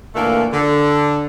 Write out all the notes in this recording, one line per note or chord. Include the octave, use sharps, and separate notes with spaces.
A#2 D3 E3 A3 A#3
D3